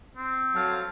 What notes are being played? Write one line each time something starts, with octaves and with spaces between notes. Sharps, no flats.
C4
F#3 A4 F5